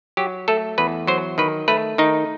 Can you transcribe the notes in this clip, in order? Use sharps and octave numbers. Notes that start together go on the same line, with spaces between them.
F#3 G4
A3 A4
E2 B4
F#3 C5
D#3 B4
A3 B4
D#3 D#4